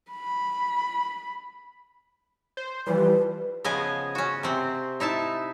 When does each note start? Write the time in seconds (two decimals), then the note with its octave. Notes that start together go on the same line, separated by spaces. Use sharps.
0.12 B5
2.57 C5
2.87 E3 F3 G3 B4
3.64 C#3 F3 B3 D#5 G#5
4.15 C#4 F#4
4.43 C3 C4
5.00 D#4 E4 E5 A5